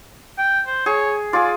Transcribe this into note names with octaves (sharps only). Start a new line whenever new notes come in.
G5
C5
G#4 C#5
F4 G#4 D5